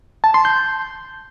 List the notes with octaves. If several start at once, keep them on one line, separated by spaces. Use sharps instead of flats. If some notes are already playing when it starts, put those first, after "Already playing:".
A5
C6
G6